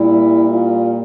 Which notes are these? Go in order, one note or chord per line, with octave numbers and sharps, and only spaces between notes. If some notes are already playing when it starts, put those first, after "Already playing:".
Already playing: A#2 G3 E4
F4